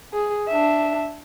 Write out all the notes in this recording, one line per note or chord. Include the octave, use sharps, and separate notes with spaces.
G#4
D4 E5